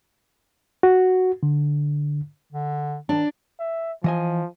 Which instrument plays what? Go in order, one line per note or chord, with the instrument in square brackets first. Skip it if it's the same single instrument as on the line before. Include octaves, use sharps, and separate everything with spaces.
[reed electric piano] F#4
D3
[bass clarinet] D3
[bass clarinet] D#3 [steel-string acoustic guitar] D4
[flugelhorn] E5
[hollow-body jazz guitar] E3 D#5 G#5 [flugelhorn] F3